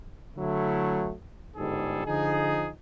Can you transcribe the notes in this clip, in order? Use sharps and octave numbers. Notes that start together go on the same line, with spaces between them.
D3 F#3 A3 E4
G1 G#2 G3 G#4 A4
D3 F3 D#4 G#4